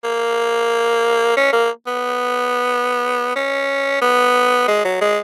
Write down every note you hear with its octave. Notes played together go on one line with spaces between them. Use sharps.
A#3
C#4
A#3
B3
C#4
B3
G#3
F#3
G#3